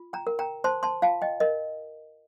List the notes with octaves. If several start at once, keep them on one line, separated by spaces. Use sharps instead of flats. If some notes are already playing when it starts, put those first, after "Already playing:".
Already playing: F4
G5 A#5
A#4
G5 A#5
C5 A5 C6
A5 C6
F4 F5 A5
D#5 G5
A#4 D#5